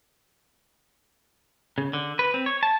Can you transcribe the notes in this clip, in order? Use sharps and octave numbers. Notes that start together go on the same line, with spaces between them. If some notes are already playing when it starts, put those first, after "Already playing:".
C#3
D3
B4
C4
C#5
A5